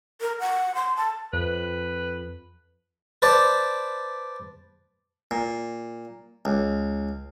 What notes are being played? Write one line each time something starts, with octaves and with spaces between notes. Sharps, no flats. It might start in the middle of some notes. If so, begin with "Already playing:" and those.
A#4
F#5
C6
A5
F2 B4
B4 C5 D5 A5
A#2
C#2